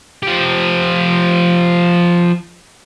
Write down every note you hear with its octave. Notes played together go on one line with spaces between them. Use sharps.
F3 G4